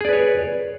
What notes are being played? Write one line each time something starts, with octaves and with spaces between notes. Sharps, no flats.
G#4 B4 C#5 D5